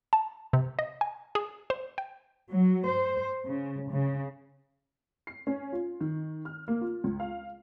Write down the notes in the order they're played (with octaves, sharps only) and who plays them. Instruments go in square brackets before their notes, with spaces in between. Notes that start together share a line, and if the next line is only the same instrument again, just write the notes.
[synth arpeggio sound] A5
C3
D#5
G#5
G#4
C5
G5
[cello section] F#3
C5
C#3
C#3
[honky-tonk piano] C7
C#4
F4
D#3
F6
A#3
F4
C#2
F5